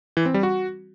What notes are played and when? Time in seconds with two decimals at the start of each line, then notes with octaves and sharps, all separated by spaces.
0.17 E3
0.26 C4
0.34 G3
0.43 F#4